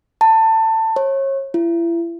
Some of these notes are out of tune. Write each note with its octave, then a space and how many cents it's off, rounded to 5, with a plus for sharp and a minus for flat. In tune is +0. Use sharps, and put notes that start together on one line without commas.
A5 +20
C#5 -30
E4 +35